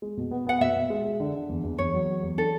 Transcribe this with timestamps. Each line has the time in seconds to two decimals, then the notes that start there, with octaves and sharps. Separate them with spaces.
0.02 G#3
0.17 B2
0.31 B3
0.47 B3 F#5
0.61 B2 E5
0.76 B2
0.90 G#3
1.05 G#3
1.20 D3
1.35 D3
1.49 E2
1.64 E2
1.78 E2 C#5
1.94 F#3
2.09 F#3
2.22 E2
2.38 D4 A4